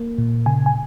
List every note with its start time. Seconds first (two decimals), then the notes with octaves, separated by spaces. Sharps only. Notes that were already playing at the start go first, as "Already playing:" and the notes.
Already playing: A#3
0.18 A#2
0.46 C#3 G#5
0.66 G#5